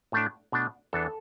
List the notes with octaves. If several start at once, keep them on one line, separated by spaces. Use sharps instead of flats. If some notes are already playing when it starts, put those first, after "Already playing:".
A2 A3 D4
B2 A3 D4
E2 E3 B3 D4 A4